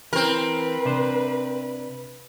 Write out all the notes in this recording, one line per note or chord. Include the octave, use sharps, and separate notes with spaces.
E3 C4 A#4 B4
C3 D4 C5